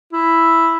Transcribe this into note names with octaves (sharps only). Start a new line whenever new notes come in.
E4